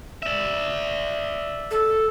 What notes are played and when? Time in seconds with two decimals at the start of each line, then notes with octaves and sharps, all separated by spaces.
0.23 D5 E5
1.71 A4